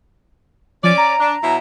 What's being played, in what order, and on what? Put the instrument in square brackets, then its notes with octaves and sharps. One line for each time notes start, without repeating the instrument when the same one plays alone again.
[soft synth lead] F3 [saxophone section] C#4 D5
[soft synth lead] A#5
[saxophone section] D4
B2 F#3 E4